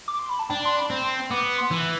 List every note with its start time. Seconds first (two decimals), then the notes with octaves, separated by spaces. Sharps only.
0.08 D6
0.19 C6
0.29 B5
0.39 A5
0.50 D4 G5
0.65 C6
0.77 B5
0.90 C4
1.04 C6
1.31 B3 D6
1.58 C6
1.71 E3